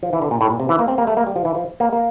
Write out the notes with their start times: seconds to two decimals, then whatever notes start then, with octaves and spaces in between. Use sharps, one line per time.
0.03 F3
0.13 E3
0.22 D3
0.31 A#2
0.41 A2
0.50 A#2
0.60 C3
0.69 E3
0.79 A#3
0.88 C4
0.98 A#3
1.07 A3
1.17 A#3
1.27 G3
1.36 F3
1.45 E3
1.55 F3
1.80 A#3
1.93 A#3